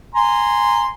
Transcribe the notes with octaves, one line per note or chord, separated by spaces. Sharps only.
G#5 A#5 C6